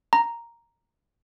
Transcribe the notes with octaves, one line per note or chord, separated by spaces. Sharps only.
A#5